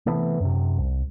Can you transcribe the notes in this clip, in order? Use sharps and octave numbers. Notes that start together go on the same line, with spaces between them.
C3 E3 A3 B3
F#2 C3
C2